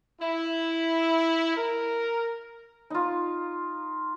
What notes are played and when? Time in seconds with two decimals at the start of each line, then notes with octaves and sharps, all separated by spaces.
0.21 E4
1.56 A#4
2.90 D#4 F4